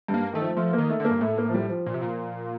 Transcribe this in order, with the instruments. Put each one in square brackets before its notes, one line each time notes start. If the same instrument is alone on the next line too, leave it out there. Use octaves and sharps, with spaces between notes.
[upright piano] G2
[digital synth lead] A#3
[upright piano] D#3 [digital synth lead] A3
[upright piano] F3
[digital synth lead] F3 [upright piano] A3
[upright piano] A#3
[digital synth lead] D#3
[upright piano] A3
[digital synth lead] D3 [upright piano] A#3
[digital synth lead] G2
[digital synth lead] A2 [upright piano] A3
[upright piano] A#3
F3
G3
F3
[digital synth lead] A#2
C3
A#2